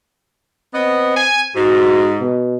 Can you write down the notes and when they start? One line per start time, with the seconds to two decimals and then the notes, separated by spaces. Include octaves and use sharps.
0.74 B3 C4 D#5
1.17 G#5
1.56 G#2 F#4
2.21 B2